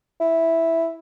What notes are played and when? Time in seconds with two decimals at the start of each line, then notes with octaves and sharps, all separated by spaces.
0.20 E4